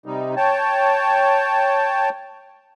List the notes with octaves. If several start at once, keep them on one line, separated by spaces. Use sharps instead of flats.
C3 G3 D#4
C#5 G5 A5